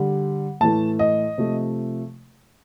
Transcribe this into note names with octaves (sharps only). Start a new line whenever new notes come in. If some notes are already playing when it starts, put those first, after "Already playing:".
Already playing: D3 G3
A2 E3 A3 A5
D#5
C3 F3 A3